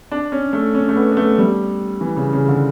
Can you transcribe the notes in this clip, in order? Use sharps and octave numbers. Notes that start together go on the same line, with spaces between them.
D4
C#4
A3
C#4
A3
B3
B3
A3
G3
E3
C#3
C#3
D3